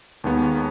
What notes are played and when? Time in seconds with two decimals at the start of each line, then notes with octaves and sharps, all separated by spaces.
0.24 D#2 D#3 G#3 B3